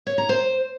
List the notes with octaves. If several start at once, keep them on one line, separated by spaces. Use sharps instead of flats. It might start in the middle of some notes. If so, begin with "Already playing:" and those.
C#5
A#5
C5